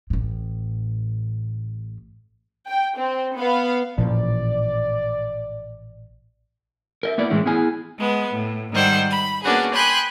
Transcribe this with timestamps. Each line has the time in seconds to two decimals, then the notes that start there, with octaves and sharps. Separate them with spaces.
0.10 A1 A2
2.68 G5
2.97 C4
3.38 B3 F5
3.98 A1 A#2 F3 D5
7.03 A#4 D#5 E5
7.18 A#3 B3 E4 D5
7.30 A2 E3 G#3 C#4 E4
7.46 B3 E4 G#4 G#5
7.99 G#3 B3
8.33 A2
8.72 G#2 D#3 G3 C5 F#5 E6
9.10 B5
9.43 A#3 B3 C#4 D4 F#4 G#4
9.73 G5 G#5 B5 C6 D#6 F#6